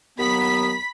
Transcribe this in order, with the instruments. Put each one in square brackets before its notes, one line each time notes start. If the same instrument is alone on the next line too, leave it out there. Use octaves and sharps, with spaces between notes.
[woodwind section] D#2 F#3 B3 [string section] B5 B6